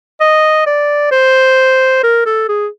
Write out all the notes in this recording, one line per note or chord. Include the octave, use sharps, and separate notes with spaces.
D#5
D5
C5
A#4
A4
G#4